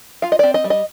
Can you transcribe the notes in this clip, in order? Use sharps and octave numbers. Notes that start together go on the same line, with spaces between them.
F4 F5
D#5
C4 D5
D#5
G3
D#5